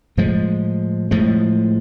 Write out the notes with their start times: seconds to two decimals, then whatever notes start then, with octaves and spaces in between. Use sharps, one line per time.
0.17 A2 F3 G#3
1.11 A2 F3 G#3